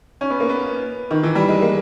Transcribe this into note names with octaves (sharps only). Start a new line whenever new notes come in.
C#4
B3
A#3
B3
D#3
E3
G3
G#3
A#3